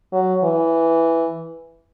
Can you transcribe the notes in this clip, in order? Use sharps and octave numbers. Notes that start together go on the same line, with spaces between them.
F#3
E3